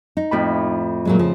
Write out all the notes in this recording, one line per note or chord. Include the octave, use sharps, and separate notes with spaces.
D#4
F2 A2 B5
A#2 F#3 G#3
C#3 F3